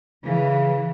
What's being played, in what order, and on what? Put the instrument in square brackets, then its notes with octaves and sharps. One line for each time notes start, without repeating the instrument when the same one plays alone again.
[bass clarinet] C#3 [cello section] E3